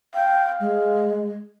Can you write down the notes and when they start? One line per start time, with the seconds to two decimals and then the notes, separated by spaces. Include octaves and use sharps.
0.14 F5 G5
0.61 G#3